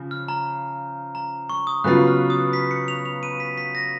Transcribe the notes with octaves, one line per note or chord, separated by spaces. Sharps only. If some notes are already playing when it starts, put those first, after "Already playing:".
Already playing: C#3 F3
F6
A#5
A#5
C#6
D#6
C#3 F#3 B3 F4 F#6
F6
D#6
B6
C#7
F7
F7
D#7
B6
B6
A#6